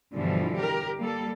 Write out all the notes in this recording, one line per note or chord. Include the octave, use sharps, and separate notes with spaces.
G2 B2 D3 E3 F3 G3
G4 A#4
G3 A#3 A4